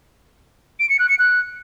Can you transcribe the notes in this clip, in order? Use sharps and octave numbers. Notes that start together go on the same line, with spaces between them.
D7
C#7
F#6
C#7
F#6